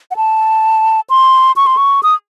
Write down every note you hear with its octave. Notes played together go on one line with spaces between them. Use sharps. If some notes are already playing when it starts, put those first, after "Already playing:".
F#5
A5
C6
C#6
C6
C#6
D#6